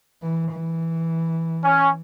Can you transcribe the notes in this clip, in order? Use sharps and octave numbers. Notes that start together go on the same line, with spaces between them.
E3
E3
C#4